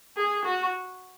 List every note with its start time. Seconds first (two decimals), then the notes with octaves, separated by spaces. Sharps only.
0.17 G#4
0.45 F#4